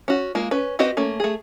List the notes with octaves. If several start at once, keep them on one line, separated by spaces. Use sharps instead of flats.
C#4 F#4
G#3 A#3 F4
C#4 B4
C4 F#4 G4 B4 D#5
A3 A#3 C#4
A3 G#4